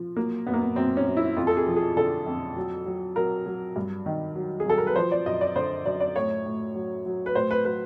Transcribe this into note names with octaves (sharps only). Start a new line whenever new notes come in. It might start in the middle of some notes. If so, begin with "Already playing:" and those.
Already playing: F3
F#3 A#3
F#2 B3
A#3
B3
F#2 C4
C#4
F#2
E4
F2 F4
A4
G#4
F3
G#4
D3 A4
F2
F#3
F#3
F#3 A#4
F#3
G2
D#3
F#3
G#4
F#3 A4
A#4
B4
F3 C5
D5
F#2 D#5
D5
D3 C5
F#2 D5
D5
A2 C#5
A2
F#3
F#3
B4
A2 C5
B4
F#3 B4